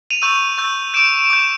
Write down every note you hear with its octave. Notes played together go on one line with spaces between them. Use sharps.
D#7 F7
C#6 E6 G6 D#7 F7
C#6 E6 G6
D6 G6 D7 E7
D6 G6